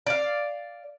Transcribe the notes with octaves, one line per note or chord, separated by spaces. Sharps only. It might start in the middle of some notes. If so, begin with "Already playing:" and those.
D5 F5